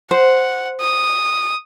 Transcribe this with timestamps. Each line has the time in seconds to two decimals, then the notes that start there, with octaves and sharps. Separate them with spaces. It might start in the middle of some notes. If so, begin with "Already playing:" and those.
0.11 C5 F#5
0.81 D#6